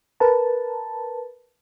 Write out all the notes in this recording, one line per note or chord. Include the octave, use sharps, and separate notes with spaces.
A#4 B4 A5